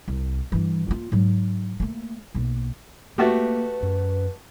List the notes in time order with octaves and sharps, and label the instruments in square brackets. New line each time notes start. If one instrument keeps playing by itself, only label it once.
[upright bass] C2
G2 E3
A#3 F4
G#2 F#3
A3 A#3
B1 A#3
[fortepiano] A3 F#4 G4 [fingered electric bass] A#3 [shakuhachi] B4
[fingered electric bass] F#2